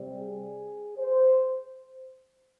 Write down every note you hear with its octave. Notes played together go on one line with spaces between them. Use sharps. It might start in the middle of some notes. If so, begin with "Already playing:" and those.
Already playing: C3 G3 C4
G#4
C5